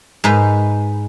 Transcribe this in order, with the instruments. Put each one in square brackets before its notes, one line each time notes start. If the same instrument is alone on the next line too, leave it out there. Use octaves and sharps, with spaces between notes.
[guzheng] G#2 D#4 B4